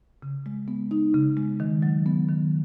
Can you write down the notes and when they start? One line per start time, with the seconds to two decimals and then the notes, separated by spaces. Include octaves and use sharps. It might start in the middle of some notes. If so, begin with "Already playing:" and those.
0.22 C#3
0.46 G#3
0.68 B3
0.91 D#4
1.14 C#3
1.37 G#3
1.60 D#3
1.82 F#3
2.06 B3
2.28 D#3